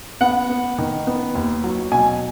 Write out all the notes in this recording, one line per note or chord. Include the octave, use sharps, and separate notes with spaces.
B3 F#5
B3
D#3
B3
D#2
F#3
B2 G#5